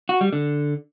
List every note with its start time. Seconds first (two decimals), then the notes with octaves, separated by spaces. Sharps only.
0.09 F#4
0.21 G3
0.33 D3